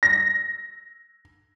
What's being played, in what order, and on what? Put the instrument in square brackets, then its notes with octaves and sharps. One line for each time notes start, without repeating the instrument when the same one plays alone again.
[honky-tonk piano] A#6